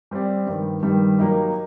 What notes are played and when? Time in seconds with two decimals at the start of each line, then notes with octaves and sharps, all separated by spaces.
0.11 G3 C4 G4 D5
0.47 G2 D#3 G3
0.83 G2 D#3 G3
1.18 F#3 A#3 D#4 G4